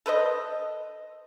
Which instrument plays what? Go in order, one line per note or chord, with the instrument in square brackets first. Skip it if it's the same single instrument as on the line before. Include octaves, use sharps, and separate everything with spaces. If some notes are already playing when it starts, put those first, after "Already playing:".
[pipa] A4 B4 C5 D#5